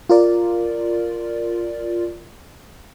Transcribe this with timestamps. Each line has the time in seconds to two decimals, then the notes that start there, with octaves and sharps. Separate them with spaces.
0.09 F4 A#4 D5